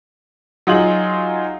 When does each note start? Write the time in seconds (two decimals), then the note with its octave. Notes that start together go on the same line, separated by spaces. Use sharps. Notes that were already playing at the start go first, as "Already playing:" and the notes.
0.67 F#3 D#4 F4 G#4 F#7